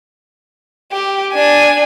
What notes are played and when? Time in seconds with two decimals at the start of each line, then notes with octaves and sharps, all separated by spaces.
0.92 G4
1.33 D4 G#5